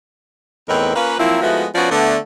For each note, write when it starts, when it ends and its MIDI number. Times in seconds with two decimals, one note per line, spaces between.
0.69 0.91 40
0.69 0.91 45
0.69 0.91 60
0.69 0.91 63
0.69 0.91 70
0.69 0.91 71
0.95 1.15 58
0.95 1.15 61
0.95 1.15 65
0.95 1.15 71
1.18 1.40 53
1.18 1.40 54
1.18 1.40 58
1.18 1.40 60
1.18 1.40 64
1.41 1.65 53
1.41 1.65 56
1.41 1.65 57
1.41 1.65 59
1.41 1.65 64
1.41 1.65 66
1.75 1.90 53
1.75 1.90 59
1.75 1.90 61
1.75 1.90 66
1.75 1.90 74
1.91 2.16 50
1.91 2.16 57
1.91 2.16 59